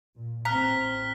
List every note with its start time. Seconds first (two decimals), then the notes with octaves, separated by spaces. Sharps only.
0.16 A#2
0.45 A1 C4 A#5 F6 F#6 B6